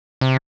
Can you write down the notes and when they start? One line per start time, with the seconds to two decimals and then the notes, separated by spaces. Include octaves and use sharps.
0.21 C3